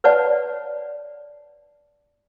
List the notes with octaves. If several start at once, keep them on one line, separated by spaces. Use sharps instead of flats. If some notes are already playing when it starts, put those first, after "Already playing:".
B4 C#5 D5 F#5 A5